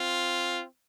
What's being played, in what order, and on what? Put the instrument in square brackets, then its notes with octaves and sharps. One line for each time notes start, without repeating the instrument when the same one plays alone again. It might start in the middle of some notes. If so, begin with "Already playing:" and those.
Already playing: [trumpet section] C4 F4